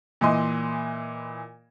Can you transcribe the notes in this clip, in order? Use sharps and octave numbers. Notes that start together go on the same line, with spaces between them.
A#2 E3 D#5 C6